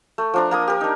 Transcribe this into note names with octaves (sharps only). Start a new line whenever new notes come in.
A3
F3 D4 A#5
A#3 A#5 D#6
G4 A#4
D4 D#4